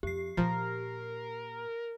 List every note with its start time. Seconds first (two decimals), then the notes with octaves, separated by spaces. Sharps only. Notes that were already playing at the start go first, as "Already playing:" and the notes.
0.03 F2 G4 C7
0.37 A#2 F3 A#4